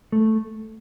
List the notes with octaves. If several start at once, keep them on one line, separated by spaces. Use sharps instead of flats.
A3